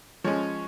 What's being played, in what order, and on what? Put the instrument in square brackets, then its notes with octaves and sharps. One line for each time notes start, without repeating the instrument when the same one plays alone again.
[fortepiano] F3 G#3 C#4 C#5